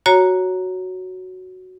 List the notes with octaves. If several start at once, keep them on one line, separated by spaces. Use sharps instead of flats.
F#4 C#5 A#5